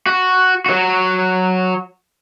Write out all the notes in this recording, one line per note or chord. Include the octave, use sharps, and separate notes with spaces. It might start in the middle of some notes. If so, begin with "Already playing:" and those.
F#4
F#3 F#4